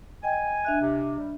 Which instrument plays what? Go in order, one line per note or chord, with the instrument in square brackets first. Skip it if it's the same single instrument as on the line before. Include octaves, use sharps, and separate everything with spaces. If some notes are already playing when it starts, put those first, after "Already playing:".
[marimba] D#5 G5 [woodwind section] G#5
[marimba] D4 E5 F#6
[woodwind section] C3
G3